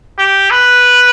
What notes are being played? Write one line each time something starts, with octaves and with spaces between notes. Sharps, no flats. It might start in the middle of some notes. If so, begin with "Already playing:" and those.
G4
B4